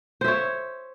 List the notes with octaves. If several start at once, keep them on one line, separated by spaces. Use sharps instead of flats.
C5 C#5 E5